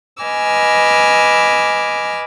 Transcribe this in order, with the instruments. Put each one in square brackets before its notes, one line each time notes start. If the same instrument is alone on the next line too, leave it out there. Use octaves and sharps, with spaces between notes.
[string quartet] B4 D#5 G#5 D6 E6 F6